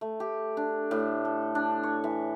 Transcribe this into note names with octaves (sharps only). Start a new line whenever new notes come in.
A3
G4
D4
A2
A4
D4
C#5
E3